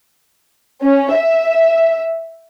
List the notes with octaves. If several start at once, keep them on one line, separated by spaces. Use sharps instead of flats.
C#4
E5